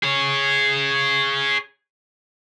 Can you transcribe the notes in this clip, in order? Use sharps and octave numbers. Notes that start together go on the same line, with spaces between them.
G#4 C#5